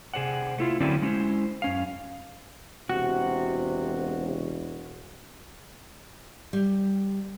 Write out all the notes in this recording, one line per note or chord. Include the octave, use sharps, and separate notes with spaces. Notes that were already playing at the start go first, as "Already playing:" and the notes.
C3 G#4 C5 D5 F#5
A3 E4 F4
D3 F#3 C4 C#4 E4 D5
G#3 C#4 E4 C5
F#2 C#4 F5
E1 C3 F#4
G3